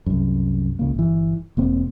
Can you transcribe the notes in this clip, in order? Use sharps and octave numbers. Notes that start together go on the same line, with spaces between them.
C2 F#2
C#2 C#3 A#3
G1 E3
E1 A#3 C4